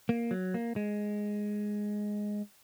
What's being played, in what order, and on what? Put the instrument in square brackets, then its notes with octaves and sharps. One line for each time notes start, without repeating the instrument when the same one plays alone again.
[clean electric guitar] A#3
F#3
A#3
G#3